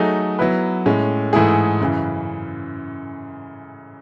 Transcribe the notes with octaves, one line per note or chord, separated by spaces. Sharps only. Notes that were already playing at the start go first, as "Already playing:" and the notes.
Already playing: F#3 A3 D#4 G#4
F#3 B3 E4 B4
A2 G#3 C#4
G#2 E3 A3 E4 G#4
F#2 C#3 E3